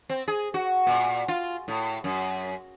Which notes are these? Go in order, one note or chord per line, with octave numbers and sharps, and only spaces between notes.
C4
G#4
F#4
A#2
F4
A2
F#2